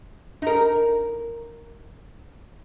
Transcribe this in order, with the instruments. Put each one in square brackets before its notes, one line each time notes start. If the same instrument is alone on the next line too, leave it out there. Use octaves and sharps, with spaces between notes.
[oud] D#4 A#4